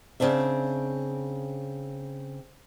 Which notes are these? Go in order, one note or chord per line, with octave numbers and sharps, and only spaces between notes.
C#3 C4 D4 E5